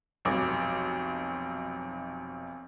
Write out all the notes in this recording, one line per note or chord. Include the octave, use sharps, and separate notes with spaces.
F1 B1 D6